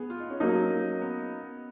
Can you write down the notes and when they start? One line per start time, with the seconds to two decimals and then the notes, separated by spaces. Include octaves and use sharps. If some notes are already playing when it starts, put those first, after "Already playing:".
Already playing: B3 G#4
0.10 F4
0.20 D#4
0.30 C#4
0.40 F#3 A#3 D#4
1.01 B3